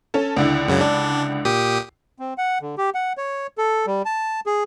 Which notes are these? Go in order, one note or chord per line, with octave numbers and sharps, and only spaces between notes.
C#4 A4
C#2 D3 E4
F#2 C#3 F#3
D4
A#2 G4 D#6
C4
F#5
D3
G4
F#5
C#5
A4
G3
A5
G#4